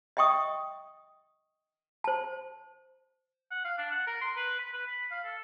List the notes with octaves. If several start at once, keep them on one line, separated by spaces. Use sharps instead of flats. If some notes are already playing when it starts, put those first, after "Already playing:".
D#5 E5 G5 C#6 D#6
C5 A5
F#5
F5
D4
F#5
A#4
C6
B4
B5
B4
B5
F5
A4